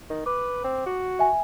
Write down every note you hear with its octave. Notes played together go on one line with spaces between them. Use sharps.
D#3
B4 D6
C4
F#4
E5 G#5